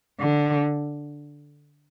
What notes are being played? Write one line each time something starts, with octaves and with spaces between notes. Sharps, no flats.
D3